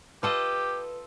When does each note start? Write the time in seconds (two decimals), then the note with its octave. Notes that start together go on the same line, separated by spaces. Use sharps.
0.23 F4 G4 A4 B4 D#5